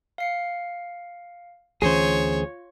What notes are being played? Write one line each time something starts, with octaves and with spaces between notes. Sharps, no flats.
F5 C7 C#7
D2 E3 C#4 F4 G#4 C5 C#5